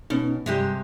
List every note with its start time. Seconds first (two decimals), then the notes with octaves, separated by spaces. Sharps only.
0.10 B2 B3 C#4 D#4
0.46 G2 C3 G3 G#3 G4